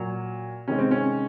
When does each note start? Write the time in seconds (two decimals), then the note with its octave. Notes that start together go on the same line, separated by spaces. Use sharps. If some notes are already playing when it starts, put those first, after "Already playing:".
Already playing: A#2 F#3
0.68 C3 D#3 G#3 C#4
0.78 C4
0.91 C#4